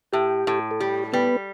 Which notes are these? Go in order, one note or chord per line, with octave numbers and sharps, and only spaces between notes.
A2 G4
A2
A4
G3 G4
G3 B3 B4